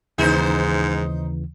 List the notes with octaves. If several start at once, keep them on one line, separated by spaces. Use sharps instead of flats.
D#2 G#2 C#3 E3 D#4 C5